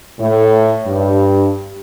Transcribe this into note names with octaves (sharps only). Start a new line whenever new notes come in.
A2
G2